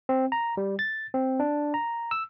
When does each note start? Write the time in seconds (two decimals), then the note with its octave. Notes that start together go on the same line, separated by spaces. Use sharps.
0.09 C4
0.32 A#5
0.57 G3
0.79 A6
1.14 C4
1.40 D4
1.74 A#5
2.11 E6